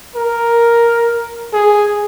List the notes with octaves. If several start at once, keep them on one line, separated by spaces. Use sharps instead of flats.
A#4
G#4